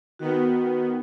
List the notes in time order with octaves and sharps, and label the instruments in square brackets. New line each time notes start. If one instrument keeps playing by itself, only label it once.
[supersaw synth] D#3 B3 [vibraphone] F#4